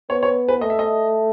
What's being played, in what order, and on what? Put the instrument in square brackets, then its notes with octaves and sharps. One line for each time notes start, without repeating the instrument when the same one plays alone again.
[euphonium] B3 [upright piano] C#5
[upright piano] C#5
B4
[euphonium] A3 [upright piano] D#5
[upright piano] E5
D#5